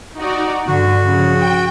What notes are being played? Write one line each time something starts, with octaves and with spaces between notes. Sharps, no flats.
D#4 F#4 D5
G2 D3 F#4
C#3 F3
G5